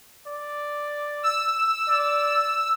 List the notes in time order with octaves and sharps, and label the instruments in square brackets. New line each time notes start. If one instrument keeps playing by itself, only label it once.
[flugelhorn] D5
[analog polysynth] E6
[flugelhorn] D5